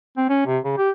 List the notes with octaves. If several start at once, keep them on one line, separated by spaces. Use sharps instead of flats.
C4
C#4
C3
C#3
G4